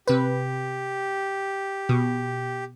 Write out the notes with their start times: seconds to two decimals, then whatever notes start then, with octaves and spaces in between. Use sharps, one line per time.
0.08 C3 G4 B4
1.89 B2